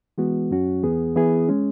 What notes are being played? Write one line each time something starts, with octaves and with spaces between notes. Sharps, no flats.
E3 G#3 B3 F#4
F#2 F#3 C#4 F#4
E2 E3 B3 G#4
E3 B3 E4 G#4
G#3 C#4